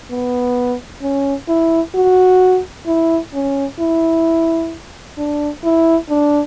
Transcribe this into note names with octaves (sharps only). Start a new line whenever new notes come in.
B3
C#4
E4
F#4
E4
C#4
E4
D4
E4
D4